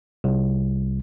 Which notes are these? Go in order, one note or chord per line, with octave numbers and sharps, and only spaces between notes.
C2